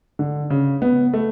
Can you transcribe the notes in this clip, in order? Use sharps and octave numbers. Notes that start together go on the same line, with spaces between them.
D3
C#3
B3
A3